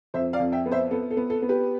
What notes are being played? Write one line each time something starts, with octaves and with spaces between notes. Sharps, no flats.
F2 C5 E5
D5 F5
F2
E5 G5
B3
C5 E5
B3 A4
A4
B3
A4
B3
G4 B4